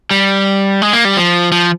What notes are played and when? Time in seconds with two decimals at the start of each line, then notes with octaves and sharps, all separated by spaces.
0.11 G3
0.82 G#3
0.93 A#3
1.05 G3
1.17 F3
1.52 F3